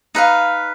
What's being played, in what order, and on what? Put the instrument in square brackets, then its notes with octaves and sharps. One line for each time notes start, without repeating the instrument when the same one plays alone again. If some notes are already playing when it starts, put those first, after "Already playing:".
[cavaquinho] D#4 B4 F5